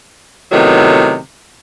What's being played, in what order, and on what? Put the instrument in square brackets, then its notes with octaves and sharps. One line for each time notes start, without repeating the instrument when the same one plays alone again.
[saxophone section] A2 C3 D#3 F#3 A3 B3